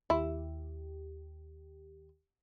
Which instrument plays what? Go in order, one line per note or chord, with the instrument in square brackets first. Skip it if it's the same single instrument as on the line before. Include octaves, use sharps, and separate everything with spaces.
[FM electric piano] D#2 G4 [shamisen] E4